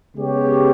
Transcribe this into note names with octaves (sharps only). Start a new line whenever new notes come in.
C#3 G#3 B3 G4 C#5